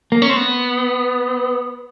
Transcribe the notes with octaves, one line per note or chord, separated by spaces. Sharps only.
A#3
C#4
C4
B3